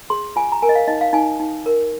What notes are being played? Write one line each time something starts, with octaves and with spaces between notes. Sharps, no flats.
G#4 C6
F4 G#5
A#5
A#4 G#5
D#5
F5
D#4 D#5
F5
D#4 G#5
D#4
A#4